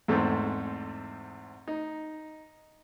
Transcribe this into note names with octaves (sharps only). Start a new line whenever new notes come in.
E2 G#2 A3 C4
D#4